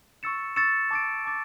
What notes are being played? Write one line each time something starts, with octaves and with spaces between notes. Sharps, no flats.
C#6 E6 A6 C#7 E7
C#6 E6 A6 C#7 E7
A5 D6 A6 D7
A5 D6 A6